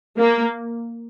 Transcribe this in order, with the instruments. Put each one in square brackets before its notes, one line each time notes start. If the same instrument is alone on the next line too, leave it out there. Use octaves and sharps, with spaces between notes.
[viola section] A#3